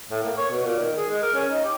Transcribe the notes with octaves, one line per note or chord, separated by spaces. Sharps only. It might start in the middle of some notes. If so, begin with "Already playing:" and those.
A2
A#3
C#5
B2
A#2
D#3
G#4
G#3
A#4
C#4
D#4
G4